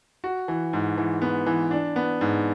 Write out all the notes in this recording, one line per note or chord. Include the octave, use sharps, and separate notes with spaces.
F#4
E3
G#2
E3
B3
E3
D4
B3
G#2